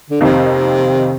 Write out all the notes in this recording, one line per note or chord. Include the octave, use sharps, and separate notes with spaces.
D3
F2 C3 D#3 A#3 D#4